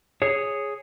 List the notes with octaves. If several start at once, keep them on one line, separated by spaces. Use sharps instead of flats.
G#4 C#5